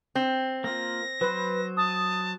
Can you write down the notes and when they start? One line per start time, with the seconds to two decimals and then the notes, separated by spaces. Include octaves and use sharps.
0.15 C4
0.64 A#3 F4 A#6
1.21 F#3 B4 C5
1.77 A5 D#6